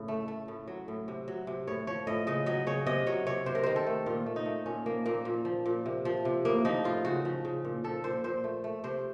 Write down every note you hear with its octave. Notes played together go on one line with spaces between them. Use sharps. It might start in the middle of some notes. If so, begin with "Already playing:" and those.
Already playing: A2 C#3
A3
A3
A2
F#3
A2
C3
F#3
C3
A2 C#5
F3 C#5
A2 D#5
C#3 D#5
F#3 D#5
C#3 C#5
C3 D#5
F#3 C#5
C3 C#5
C3 C5
A#4
D#3 C5
A4
A3
A#2 F4
A3
D#4
A3
A#2 C#4
F3 A#3
A#2 A#3
A#2
F3
A#2
C3
F3
C3
A2 A#3
F3 D#4
A2 F4
C#3 F#4
F3
C#3
A#2
F3 A4
A#2 C5
A#2 C5
A3
A3
C3 C5